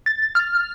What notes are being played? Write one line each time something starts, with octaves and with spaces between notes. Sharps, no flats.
A6
F6